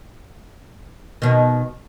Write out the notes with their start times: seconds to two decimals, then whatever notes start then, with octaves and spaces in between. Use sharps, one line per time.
1.22 B2 D#3